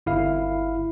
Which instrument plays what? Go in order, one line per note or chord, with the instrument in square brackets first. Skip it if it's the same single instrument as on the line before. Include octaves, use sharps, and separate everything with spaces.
[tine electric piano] G1 E4 F5